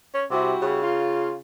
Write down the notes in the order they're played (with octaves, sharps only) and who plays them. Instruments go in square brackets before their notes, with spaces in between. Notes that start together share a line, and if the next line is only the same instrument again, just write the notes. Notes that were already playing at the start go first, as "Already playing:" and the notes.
[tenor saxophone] C#4
[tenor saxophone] C3 [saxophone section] G3 E4 F#4
[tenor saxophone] C#3
[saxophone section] F4